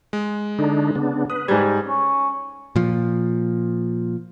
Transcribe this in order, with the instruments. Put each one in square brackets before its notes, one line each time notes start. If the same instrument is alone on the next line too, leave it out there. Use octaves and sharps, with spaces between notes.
[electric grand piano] G#3
[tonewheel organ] D3 D4 D#4
C#3 B3 D4
[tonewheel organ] B4 [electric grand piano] D#6
[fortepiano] G#2 G3 [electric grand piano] G#6
[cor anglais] C#4
[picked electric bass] A#2 F3